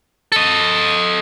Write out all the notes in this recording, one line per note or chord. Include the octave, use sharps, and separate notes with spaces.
A4 D#5